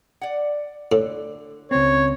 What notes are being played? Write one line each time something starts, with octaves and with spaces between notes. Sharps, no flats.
D5 F#5
A2 D3
C#2 C4 C#5